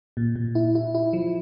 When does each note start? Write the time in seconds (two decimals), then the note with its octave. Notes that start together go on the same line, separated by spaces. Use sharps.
0.17 A#2
0.36 A#2
0.55 E4
0.75 E4
0.95 E4
1.13 F3